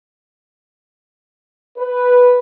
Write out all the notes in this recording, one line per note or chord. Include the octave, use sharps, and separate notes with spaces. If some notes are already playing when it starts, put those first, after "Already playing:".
B4